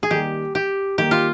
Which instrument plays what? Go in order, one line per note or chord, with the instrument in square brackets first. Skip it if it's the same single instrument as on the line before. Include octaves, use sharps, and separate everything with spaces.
[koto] G#4
[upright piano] D#3 G3 A#3 [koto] G4
[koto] G4
[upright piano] D#3 G3 A#3 [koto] G4
[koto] F4